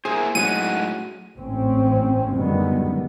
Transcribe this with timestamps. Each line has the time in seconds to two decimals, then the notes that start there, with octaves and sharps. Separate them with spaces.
0.05 A#3 E4 G#4 C5
0.35 A2 F#3 G#3 C#4 D#4 F#4 D#7
1.38 A1 G#2 C4 C#4
2.32 F#2 D3 D#3 G3 G#3 B3